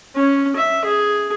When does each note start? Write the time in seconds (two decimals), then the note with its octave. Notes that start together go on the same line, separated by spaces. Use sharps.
0.16 C#4
0.56 E5
0.85 G#4